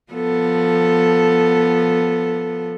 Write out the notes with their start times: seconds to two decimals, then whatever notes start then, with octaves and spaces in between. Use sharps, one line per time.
0.12 F3 B3 A4